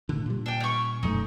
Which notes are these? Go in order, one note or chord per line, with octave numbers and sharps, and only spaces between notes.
A2 D3
A#2 G3
D4 G5
C#4 C#6
E1 F#2 A3 D#4